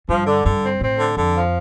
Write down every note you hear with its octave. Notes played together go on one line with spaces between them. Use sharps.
G2 F3
D3
G2 D3
C4
A2 C4
D3
F2 D3
F3